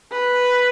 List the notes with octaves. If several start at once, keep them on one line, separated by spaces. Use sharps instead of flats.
B4